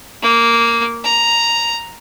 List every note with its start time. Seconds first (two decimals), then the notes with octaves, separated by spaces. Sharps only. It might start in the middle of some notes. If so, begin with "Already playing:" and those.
0.23 A#3
1.04 A#5